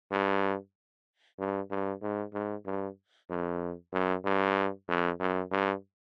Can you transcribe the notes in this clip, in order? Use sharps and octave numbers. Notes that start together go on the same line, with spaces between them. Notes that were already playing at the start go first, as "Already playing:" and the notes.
G2
G2
G2
G#2
G#2
G2
F2
F#2
G2
F2
F#2
G2